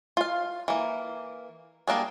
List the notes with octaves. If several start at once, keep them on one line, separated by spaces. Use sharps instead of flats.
F4 F5
E3 A#3
G3 A#3 D4 G#4